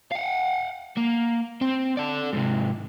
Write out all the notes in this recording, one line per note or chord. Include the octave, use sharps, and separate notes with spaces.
F5 F#5
A#3
C4
A4 D5
G#2 C3